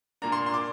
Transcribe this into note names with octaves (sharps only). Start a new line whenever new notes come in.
A#2 A#3 D4 A#5
C6
C6
D6